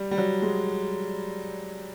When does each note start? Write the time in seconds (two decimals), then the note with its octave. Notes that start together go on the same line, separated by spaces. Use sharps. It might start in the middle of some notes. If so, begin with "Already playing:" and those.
Already playing: G3
0.11 G3
0.18 F#3
0.42 G#3